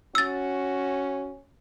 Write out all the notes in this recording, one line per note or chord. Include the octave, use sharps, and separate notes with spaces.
C#4 F#4 E6 A6